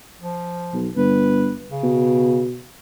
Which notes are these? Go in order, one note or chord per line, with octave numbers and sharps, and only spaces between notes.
F3
B1
G1 B4
C#3
B2